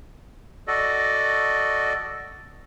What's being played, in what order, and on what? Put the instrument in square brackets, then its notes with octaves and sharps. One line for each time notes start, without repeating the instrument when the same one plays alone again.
[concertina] F#4 A4 D5 D#5